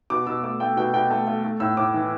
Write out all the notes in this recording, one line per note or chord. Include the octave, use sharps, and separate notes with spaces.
B2 D6
B2 E6
A3 D6
A3 G5
B2 G5
B2 G5
A3 A5
A3
A3
A2 E6
A2 D6
E3